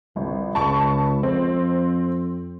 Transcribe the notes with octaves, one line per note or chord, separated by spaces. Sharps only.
G1 C2
C#2 A5 B5 C#6
F2 C4